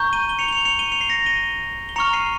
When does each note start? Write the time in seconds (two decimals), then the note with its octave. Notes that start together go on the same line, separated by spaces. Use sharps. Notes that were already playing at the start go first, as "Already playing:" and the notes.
Already playing: A#5 C#6 G6
0.13 D#7 G7
0.29 G7
0.39 C#7 F7
0.48 G7
0.53 C#7 F7
0.65 C#7 F7
0.79 D#7 G7
0.92 C#7 F7
1.01 C7
1.09 A#6 C#7
1.26 D#7 G7
1.89 G7
1.96 A#5 C#6 F6 C#7 F7
2.13 C7 D#7